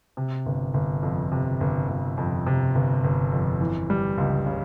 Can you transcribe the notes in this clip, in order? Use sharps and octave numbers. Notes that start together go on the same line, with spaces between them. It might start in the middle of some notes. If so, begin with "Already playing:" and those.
C3
G1
G1
F2
C3
G1
G1
F2
C3
G1
G1
F2
E3
G3
C#2
C#3